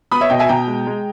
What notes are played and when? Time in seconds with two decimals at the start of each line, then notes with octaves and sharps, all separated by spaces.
0.11 B3 B5 D#6
0.21 C#5 E5
0.30 B2 D#5 G5
0.39 E5 G#5
0.49 B2 G5 A#5
0.67 G#3
0.86 G#3